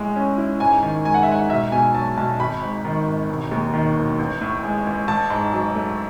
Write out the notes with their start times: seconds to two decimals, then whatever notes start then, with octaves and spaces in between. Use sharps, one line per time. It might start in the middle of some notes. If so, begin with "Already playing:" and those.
Already playing: A2 G#3
0.16 C#4
0.38 E4
0.60 G#2 G#5
0.83 D#3
1.05 G#3 G#5
1.14 F#5
1.23 E5
1.28 G#2 F#5
1.50 B1 E5
1.72 B2 G#5
1.94 F#3 A5
2.17 B1 A5
2.40 G#1 B5
2.62 G#2
2.85 D#3
3.07 G#1
3.30 E1
3.51 D#2
3.74 D#3
3.97 E1
4.19 A1
4.41 A2
4.63 G#3
4.87 A1
5.08 A1 A5
5.30 G#2
5.53 F#3
5.75 A3